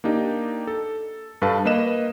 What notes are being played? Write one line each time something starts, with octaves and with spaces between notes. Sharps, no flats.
A#3 D4 D#4 G4
A4
G2 A4 B4 F5 A5
A#3 B4 D#5 E7